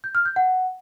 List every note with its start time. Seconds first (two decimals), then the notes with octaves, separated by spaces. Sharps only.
0.04 G6
0.15 F6
0.25 G6
0.36 F#5